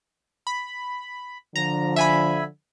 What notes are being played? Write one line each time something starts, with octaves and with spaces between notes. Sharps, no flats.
B5
D3 F3 A#5
E5 G#5 B5